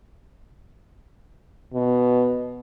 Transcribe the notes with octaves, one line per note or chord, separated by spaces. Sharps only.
B2